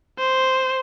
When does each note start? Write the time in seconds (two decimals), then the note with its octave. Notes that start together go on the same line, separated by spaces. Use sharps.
0.19 C5